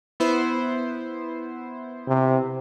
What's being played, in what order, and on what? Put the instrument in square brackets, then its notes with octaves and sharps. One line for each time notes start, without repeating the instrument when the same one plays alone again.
[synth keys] B3 E4 C5
[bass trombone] C3